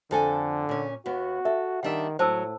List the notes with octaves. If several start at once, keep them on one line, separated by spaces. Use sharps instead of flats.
F2 D3 A4 G#5
A#2 C#4
D#2 B3 F#4
A4 E5
D#3 G3 D4 E5 F#5
A2 F#3 C5 A5 E6